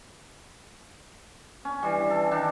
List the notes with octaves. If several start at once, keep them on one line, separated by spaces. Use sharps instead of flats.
C#4
E3 G3
A4
D#3 D4